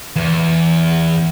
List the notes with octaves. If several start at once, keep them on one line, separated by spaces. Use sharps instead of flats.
E2